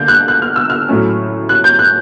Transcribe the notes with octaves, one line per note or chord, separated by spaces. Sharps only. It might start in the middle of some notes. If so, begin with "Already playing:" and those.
Already playing: D3 A#3 G6
F#6
F#6
F6
E6
F6
A2 F#3 A3 C#4
F#6
G6
F#6